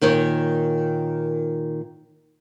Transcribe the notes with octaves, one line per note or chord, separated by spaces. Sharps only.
A#2 D#3 C#5